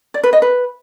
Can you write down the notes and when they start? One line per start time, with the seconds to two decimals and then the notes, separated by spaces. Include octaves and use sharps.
0.14 D5
0.23 B4
0.33 D#5
0.42 B4